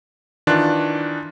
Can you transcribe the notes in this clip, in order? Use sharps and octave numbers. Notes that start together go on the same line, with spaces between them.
D#3 E3 D4 F4 F#6 A6